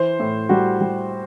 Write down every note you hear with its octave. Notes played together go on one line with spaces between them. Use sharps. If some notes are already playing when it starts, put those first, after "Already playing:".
Already playing: E3 C5
A2
G3 F#4
G3